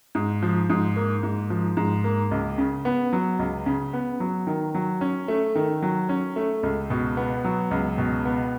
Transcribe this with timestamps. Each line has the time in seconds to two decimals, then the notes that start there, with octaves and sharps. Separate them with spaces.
0.15 G#2
0.42 F3
0.70 G#2
0.96 A#3
1.23 G#2
1.50 F3
1.77 G#2
2.04 A#3
2.31 C#2
2.58 C#3
2.85 B3
3.13 F#3
3.39 C#2
3.66 C#3
3.93 B3
4.20 F#3
4.47 D#3
4.75 F#3
5.01 C#4
5.28 A3
5.55 D#3
5.82 F#3
6.09 C#4
6.36 A3
6.63 C#2
6.90 B2
7.17 B3
7.44 F#3
7.71 C#2
7.98 B2
8.25 B3